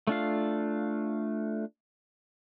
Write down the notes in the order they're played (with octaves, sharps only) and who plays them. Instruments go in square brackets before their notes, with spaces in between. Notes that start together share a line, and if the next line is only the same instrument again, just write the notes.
[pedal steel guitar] A3 D4 F4 F5